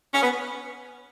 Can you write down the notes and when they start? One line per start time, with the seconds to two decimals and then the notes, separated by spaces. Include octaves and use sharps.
0.14 C#4
0.23 B3